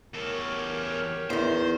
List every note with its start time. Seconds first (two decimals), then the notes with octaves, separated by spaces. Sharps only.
0.14 E2 G4 A4 A#4 C#5
1.30 E2 D#3 C5